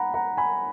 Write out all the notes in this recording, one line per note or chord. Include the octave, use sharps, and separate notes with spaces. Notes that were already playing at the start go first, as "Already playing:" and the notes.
Already playing: F#5 A#5 B5
F#5 A#5
G#5 B5